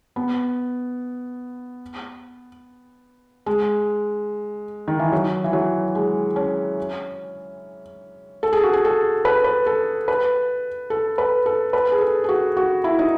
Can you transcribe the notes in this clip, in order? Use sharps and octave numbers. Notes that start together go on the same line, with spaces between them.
B3
G#3
D#3
E3
F#3
E3
F#3
G#3
C#4
A4
G#4
F#4
G#4
A4
B4
B4
A4
B4
A4
B4
A4
B4
G#4
A4
G#4
F#4
F#4
E4
D#4